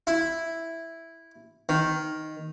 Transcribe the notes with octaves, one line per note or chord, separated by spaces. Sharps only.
E4
D#3